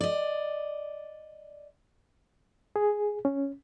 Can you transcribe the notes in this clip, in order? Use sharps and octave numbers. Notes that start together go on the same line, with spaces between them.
D5 D#5
G#4
C#4